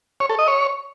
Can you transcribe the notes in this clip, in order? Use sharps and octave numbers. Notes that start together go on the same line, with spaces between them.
C#5
A4
D#5
C#5